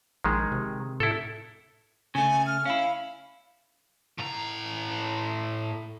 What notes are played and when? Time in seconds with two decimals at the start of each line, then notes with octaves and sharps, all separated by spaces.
0.24 A#1 D#3 G#3
0.52 C3
1.00 A2 E4 A4
2.15 C#3 A3 G#5
2.47 F6
2.65 C#4 E4 F5
4.18 A2 A#5